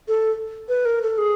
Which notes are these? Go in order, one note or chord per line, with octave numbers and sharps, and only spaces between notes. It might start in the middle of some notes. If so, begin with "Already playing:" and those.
A4
B4
A#4
A4
G#4